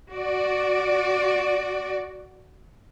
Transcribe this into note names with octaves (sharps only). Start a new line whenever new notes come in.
F#4 D5